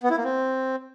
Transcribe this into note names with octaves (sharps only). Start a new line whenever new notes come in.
B3
E4
A#3
C4